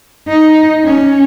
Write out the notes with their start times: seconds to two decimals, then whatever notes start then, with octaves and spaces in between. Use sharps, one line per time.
0.28 D#4
0.84 C#4